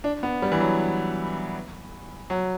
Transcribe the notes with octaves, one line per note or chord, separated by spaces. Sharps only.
D4
B3
G3
E3
F#3
F#3